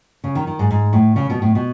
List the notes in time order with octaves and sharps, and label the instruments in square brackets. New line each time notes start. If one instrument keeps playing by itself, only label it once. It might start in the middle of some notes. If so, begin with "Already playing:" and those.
[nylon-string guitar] C#3
D#3
D#3
G#2
G#2
A2
C#3
B2
A2
B2